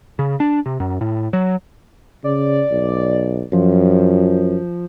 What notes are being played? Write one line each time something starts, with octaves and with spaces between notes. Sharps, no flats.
C#3
D4
C3
F#2
A2
F#3
C#3 D5
B1
F#2 F3